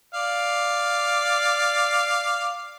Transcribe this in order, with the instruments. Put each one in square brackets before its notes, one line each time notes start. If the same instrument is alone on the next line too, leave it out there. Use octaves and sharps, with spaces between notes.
[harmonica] D5 F5